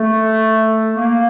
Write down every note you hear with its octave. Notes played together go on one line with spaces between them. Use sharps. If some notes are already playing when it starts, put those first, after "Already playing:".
Already playing: A3
A#3